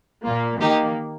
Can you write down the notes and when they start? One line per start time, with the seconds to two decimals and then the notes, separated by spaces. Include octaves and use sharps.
0.25 A#2 A#3 F4
0.60 D#3 A#3 D#4 G4